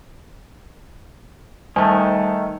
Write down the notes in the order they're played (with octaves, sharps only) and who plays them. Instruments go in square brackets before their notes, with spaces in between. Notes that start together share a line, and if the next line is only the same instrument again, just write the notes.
[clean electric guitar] D#3 A3 [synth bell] G3 D#4 [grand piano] G#5 A5